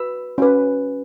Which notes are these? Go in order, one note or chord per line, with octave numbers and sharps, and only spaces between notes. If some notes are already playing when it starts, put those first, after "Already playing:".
Already playing: F#4 B4 B5 E6
C#4 F#4 B4